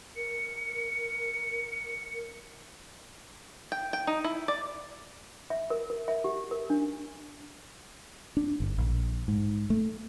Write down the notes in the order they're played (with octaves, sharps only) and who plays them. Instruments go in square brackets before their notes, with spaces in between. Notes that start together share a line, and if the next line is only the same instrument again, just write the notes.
[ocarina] A#4 [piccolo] C#7
[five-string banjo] G5
G5
D#4
E4
D5
[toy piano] E5
A#4
A#4
E5
G4
A#4
D4
[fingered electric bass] D4
G1
A#1
G#2
A3